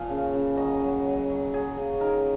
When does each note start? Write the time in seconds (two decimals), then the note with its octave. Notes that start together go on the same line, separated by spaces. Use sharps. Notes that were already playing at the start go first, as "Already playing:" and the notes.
Already playing: A#2 F3 F5 G#5
0.09 C#3
0.33 C#3
0.57 F#3 D#5
0.81 F#3
1.05 F#3
1.29 F#3
1.53 F#3 G#4
1.77 C#3
2.01 D#3 A#4